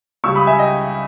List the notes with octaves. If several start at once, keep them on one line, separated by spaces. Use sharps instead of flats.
C#2 C#3 G3 C#6 E6
B5 D#6
E5 G#5
D#5 G5